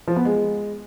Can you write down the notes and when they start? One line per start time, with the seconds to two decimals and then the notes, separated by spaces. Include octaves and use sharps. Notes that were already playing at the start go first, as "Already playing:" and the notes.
0.08 F3
0.16 B3
0.25 G#3